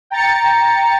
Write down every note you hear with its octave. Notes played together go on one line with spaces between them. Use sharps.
G5 A#5 A6 C#7